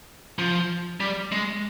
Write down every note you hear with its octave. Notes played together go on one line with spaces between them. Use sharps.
F3
G3
G#3